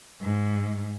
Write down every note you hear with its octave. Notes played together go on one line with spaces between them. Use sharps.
G#2